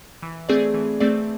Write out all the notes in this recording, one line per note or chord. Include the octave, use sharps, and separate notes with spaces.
E3
A3 C4 G#4 D5
E3
A3 C4 G#4 D5